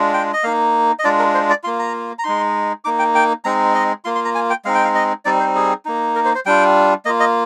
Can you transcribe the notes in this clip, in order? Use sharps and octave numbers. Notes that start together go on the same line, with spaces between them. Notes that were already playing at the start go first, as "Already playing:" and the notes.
Already playing: G#3 D4 F4
G5
D#5
A#3 D#4 F5
D#5
G#3 D4 F4 D5
A#4
C5
D5
A#3 F4 C6
A#5
A#5
G#3 D#4 C6
A#3 D#4 D6
G5
G5
G#3 C4 D#4 A#5
D#5
A#3 F4 C6
C6
A#5
G#5
G5
G#3 C4 D#4 F5
G5
F5
D#5
G3 C4 D#4 D5
C5
G#4
A#3 D#4
A#4
C5
C5
G3 D4 F4 G5
A#3 F4 D#5
D#5